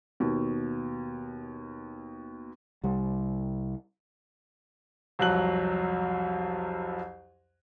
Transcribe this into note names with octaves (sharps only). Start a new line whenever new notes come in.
D#2 B2
C2 G3
C2 F2 F#3 F#6 F#7